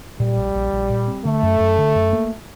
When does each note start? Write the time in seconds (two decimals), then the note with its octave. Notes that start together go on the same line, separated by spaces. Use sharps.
0.20 A#2 G3
0.37 A#1
0.55 A#1
0.72 A#1
0.90 A#2
1.07 C4
1.25 D3 A3
1.43 F#2
1.60 F#2
1.78 D3
1.95 F#2
2.13 A#3